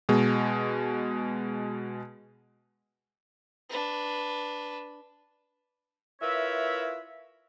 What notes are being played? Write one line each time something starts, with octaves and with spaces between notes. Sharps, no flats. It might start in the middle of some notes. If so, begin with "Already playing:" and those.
B2 G#3
D4 B4
E4 F4 A#4 B4 C#5 E5